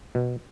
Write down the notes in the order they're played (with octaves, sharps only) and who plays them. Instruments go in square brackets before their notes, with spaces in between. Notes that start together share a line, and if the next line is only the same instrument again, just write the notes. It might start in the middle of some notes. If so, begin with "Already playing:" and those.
[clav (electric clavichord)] B2